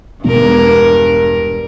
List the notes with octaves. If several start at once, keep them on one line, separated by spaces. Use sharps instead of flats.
E1 G2 A#4